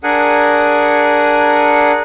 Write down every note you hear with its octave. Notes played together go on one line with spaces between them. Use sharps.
D4 G#4 A#4 F#5 G#5